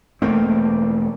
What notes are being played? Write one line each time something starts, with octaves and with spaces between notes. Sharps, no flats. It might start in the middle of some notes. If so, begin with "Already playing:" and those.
E1 A3 A#3 C4